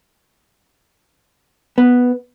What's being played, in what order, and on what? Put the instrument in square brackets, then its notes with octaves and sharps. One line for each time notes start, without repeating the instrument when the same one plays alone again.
[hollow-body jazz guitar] B3